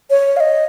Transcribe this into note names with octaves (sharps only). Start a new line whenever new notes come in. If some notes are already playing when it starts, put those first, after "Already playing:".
C#5
F5
D#5